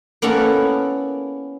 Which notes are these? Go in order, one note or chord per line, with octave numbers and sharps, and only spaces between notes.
A#3 B3 C#4 E4 A4